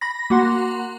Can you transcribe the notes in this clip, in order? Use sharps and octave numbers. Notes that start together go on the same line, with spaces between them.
B5 A#6
A#3 F#4 F#5 C6